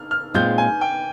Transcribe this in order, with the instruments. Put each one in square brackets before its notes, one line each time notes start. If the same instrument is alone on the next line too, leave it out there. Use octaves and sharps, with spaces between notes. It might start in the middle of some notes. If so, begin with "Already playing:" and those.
Already playing: [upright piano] F6
F6
[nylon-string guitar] A#2 G#3 C4 F4 [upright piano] G6
[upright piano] G#5
G5